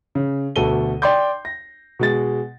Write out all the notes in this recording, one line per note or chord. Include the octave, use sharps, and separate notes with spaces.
C#3
D2 B2 A4 D#7 G7
D5 G5 C6 D6 G6
A#6
B2 G#3 A6